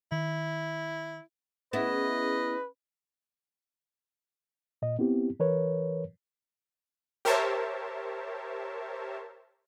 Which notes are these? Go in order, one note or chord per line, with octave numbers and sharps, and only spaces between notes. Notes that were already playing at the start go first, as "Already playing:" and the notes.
D#3 E4
B3 C#4 E4 G#4 B4 D#5
A#2 D#5
B3 C4 E4 G4
E3 A#4 B4 C#5
G4 A#4 C5 C#5 E5 A5